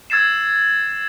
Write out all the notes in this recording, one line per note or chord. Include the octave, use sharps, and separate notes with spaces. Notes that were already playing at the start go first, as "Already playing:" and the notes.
E6 G#6 A6 C7 E7